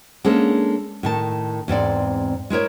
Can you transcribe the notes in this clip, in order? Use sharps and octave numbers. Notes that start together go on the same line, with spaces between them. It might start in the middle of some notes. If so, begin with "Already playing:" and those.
G#3 A#3 C#4 D4 A4
A2 D#3 A5
E2 G#2 C4 D5
G#3 E4 A#4 C#5